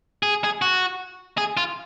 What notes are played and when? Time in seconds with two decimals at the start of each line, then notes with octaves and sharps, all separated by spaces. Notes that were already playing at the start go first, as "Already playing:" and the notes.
0.23 G#4
0.44 G#4
0.62 F#4
1.38 G#4
1.57 F4